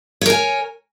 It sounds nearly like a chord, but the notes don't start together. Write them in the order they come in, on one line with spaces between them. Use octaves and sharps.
C#5 A#4 G#5